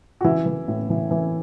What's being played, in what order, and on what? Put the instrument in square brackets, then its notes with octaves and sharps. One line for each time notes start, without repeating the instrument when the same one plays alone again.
[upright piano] F#4
E3 E4
E3
A2
E3
E3